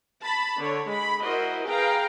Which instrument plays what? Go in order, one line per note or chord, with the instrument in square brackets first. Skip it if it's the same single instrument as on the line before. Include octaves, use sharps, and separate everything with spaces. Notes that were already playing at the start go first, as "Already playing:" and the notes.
[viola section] A5 B5
D3 C#5
G#3 B5
E4 F#4 A#4 C5 D#5
G#4 B4 F5 G5 A#5